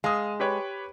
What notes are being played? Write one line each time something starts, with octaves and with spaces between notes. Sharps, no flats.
G#3 F5 D#6
G4 B4 C#5